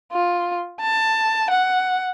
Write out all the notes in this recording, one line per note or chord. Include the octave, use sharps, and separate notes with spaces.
F4
A5
F#5